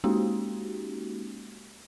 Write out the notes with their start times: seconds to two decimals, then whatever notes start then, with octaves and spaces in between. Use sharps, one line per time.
0.04 G#3 A#3 C#4 D#4 F#4 G4